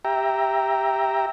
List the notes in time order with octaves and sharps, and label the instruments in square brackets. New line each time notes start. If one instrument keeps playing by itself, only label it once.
[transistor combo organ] G4 E5 G5 A#5